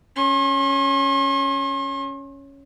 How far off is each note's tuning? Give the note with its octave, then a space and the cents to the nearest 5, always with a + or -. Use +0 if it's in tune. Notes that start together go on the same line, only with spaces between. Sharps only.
C#4 +0 C6 +45